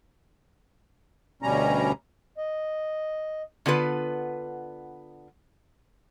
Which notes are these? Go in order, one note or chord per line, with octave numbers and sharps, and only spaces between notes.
D2 B2 G3 C#4 A#5
D#5
D3 B3 F4 B4